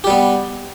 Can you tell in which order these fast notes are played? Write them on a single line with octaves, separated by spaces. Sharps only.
G4 G3 B3